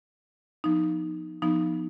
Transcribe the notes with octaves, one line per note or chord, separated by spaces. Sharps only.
F3 B3 D#4
F3 B3 D#4